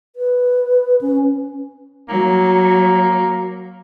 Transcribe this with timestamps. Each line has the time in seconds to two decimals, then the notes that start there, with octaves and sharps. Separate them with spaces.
0.16 B4
1.01 C#4
2.09 F#3 A#3